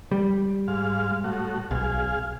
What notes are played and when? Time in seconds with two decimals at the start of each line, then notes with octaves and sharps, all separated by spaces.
0.11 G3
0.68 G#2 F5
1.24 A2 F#4
1.71 B1 G#4 F5